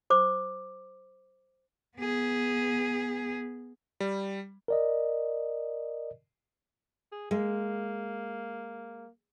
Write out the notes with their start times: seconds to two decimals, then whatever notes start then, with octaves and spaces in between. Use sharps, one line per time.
0.10 C5 D6
1.97 B3 G#4
4.00 G3
4.68 A#4 D5 D#5
7.12 G#4
7.31 G#3 A#3